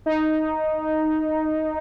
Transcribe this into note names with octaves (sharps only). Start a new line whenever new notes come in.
D#4